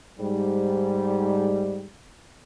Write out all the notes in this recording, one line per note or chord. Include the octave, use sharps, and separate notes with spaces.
G#2 G3